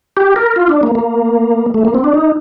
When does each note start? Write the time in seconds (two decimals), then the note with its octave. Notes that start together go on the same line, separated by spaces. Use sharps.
0.17 G4
0.36 A#4
0.56 F4
0.69 D4
0.83 A#3
0.95 A#3
1.74 A3
1.85 A#3
1.95 C4
2.04 D4
2.14 D#4